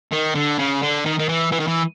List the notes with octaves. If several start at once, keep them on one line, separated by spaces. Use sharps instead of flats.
D#3
D3
C#3
D3
D#3
D#3
E3
E3
D#3
E3